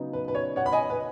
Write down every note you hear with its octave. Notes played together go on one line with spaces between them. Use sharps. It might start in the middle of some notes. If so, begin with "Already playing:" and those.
Already playing: C#3 F#3 B3 D#4
B4
B4
C#5
C#5 F#5
B5
D#5 G#5
B4